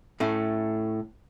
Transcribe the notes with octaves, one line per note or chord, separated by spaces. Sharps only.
A2 A3 C#4